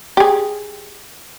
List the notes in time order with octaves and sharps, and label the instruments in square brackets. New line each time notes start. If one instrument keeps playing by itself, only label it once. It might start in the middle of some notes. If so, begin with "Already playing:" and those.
[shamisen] G4 G#4